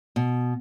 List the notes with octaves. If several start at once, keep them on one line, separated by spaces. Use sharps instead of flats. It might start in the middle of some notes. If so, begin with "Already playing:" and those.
B2